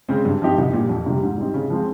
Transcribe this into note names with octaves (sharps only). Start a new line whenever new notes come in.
C#3 G#3 C4
G2
F3 C4 D#4 G4
C2
A#2 G3
F2
C3 G3
G#2
G3 C4 D#4
C#3
F3 G#3 C4